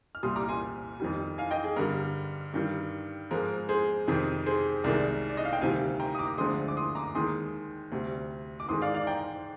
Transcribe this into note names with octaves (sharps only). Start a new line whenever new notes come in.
F6
C2 A#2 G3 C6 D#6
A#5 D6
G#5 C6
F2 D#3 G3
F5 G#5
D#5 G5
G#4
G2 D3 G3 A#4
G2 D#3 G3
G#2 F3 G#3 A#4
G#4 C5
F2 C3 D#3
G#4 C5
C2 C3 D#3 G#3 A#4 D5
D5
D#5
F5
G5
D2 C3 D#3 G3 F5 G#5
G5 A#5
D#6
A#5 D6
D2 D3 F3 G#3 C6 D#6
D6
C6 D#6
A#5 D6
D#2 D#3 G#3 C6 D#6
D2 C3 G3
D6
G#2 D#3 G#3 C6 D#6
D5 F5
D5 F5
G5 A#5